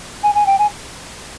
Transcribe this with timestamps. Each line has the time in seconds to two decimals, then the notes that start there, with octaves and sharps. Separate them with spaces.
0.23 G#5
0.35 G#5
0.46 G5
0.59 G#5